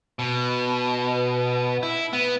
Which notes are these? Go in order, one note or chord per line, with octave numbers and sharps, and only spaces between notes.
B2
E4
B3